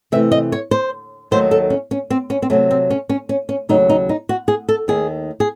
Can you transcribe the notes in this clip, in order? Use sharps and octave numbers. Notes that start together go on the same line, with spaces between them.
C3 E3 A3 E5
D#5
C#5
C5
D#2 D#3 F#3 A3 C5
A4
C#4
C#4
C4
C#4
C4
C3 F#3 A3 C#4
C4
C#4
C#4
C#4
C#4
D#2 C#3 F#3 A3 D#4
D#4
D#4
F#4
G#4
A4
D#2 D#3 A3 G#4
G#4